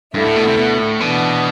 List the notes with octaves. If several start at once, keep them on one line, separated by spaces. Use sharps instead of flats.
D2 G2 D3 A3 E4
A2
B2
C3
B2
A2
B2 E3 B3 D4